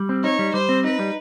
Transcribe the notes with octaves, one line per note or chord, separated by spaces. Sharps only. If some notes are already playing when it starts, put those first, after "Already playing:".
Already playing: G3
C4
D#4 C#5
G3
G3 C5
C4
D#4 B4
G3